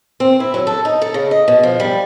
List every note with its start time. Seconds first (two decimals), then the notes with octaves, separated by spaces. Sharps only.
0.20 C4
0.40 E4
0.54 F#3
0.67 A4
0.85 D#4
1.02 A4
1.14 C#3
1.31 D#5
1.48 B2
1.63 F3
1.80 G3